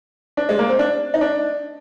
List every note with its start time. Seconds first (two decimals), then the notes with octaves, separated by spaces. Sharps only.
0.37 D4
0.49 G#3
0.59 A#3
0.69 C4
0.79 D4
1.14 D#4
1.21 D4